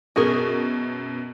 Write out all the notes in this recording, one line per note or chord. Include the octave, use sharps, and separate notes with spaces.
F#2 B2 F#4 G#4 A#4